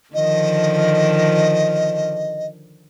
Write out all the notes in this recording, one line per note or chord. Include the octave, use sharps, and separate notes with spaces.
D3 D#3 F3 D#5